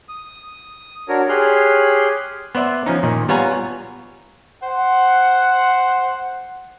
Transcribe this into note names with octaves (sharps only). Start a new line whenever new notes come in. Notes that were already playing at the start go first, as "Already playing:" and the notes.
D#6
D4 F#4 A#4 C#5
G4 G#4 C#5 C6 F6 F#6
B3 C5 D5 E5
F3 C#4 D#4
A#2 D#3
G3 B3 F4 C#5 G#5 A#5
C5 F#5